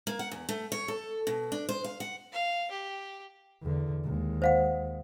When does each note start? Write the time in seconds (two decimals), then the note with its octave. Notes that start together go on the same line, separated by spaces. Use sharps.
0.07 A#3
0.19 F#5
0.32 E2
0.49 A3
0.72 C#5
0.88 A4
1.27 B2
1.52 D4
1.69 C5
1.84 F5
2.00 F#5
2.32 F5
2.71 G4
3.62 E2 D3
4.04 D#2 G#3
4.42 C5 F5 F#5